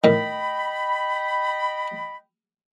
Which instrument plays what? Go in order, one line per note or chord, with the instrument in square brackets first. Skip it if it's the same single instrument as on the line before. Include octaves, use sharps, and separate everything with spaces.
[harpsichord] A2 D#3 [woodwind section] D#5 G5 B5